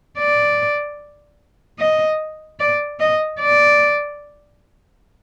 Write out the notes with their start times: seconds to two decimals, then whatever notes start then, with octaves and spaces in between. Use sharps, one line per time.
0.18 D5
1.79 D#5
2.59 D5
3.00 D#5
3.39 D5